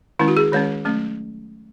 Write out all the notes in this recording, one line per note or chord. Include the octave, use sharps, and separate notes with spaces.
D#3 G#3 C#4 E4
F#4
G#4
D#3 G#3 C#4 C#5
F#3 A3 C#4